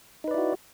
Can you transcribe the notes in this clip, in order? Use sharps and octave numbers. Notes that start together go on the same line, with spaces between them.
D#4 E4 F#4 B4 D5